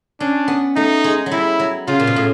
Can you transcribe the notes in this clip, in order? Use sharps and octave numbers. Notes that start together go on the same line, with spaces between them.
C#4 D4
B3
A3 D#4
G#3
F#3
G3 E4
F#3
C#3 F4
A#2
B2
A2